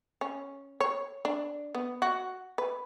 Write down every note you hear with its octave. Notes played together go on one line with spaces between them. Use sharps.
C#4
C#5
D4
B3
F#4
B4